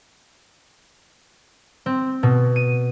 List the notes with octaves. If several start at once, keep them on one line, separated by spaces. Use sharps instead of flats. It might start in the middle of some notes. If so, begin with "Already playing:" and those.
C4
B2
D#7